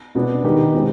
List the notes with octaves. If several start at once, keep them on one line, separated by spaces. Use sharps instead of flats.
B2 B3 D4
D#3 B3 D#4 G4
B2 G#3 C4 G4